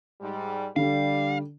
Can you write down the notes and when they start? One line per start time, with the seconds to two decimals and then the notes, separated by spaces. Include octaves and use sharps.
0.21 G#2 G3
0.76 D3 G3 F5